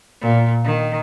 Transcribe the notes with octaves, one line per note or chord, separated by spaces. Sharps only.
A#2
D#3